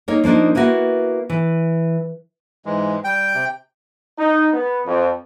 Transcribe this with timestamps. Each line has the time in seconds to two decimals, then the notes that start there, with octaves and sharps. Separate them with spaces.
0.08 A#3 D#4 C#5
0.24 F3 A#3 D4 D#4
0.55 A#3 B3 E4 F#4
1.30 E3
2.65 G#2 E3 G#3
3.04 G3 G5
3.34 C3
4.18 D#4
4.54 B3
4.85 F2